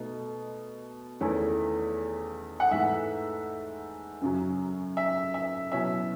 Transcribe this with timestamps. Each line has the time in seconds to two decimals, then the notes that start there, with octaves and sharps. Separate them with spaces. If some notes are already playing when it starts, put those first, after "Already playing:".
Already playing: B2 A3 D#4
1.20 E2 D#3 A3 C#4 E4
2.60 F#5
2.71 G#2 E3 A3 E5
4.21 F#2 C#3 F#3
4.97 E5
5.34 E5
5.72 B2 F#3 C#4 E4 E5